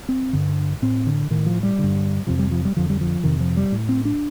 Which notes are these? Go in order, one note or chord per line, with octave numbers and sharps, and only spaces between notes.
C4
G2 D3
A2 C4
D3
A2 D#3
F3
G3
G2 D3
F2 C3 F3
G3
F3
G3
F2 D3 F3
G3
F3
F2 C3 D#3
F3
G3
A2
C4
D4